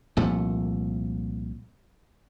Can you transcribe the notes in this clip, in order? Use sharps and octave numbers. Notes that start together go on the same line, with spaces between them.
C2 A#2 F3 A3